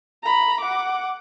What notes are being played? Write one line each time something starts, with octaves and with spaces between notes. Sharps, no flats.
A#5 B5
F#5 D6